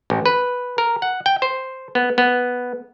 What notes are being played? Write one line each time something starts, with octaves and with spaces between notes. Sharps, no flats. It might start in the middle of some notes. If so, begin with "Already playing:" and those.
A1
B4
A#4
F#5
G5
C5
B3
B3